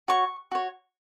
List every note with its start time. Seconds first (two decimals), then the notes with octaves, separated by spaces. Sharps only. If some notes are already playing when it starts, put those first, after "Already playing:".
0.08 F#4 C#5 C#6
0.52 F#4 C#5